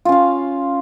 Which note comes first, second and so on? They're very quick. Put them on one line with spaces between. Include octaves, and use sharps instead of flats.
F4 C#4 F5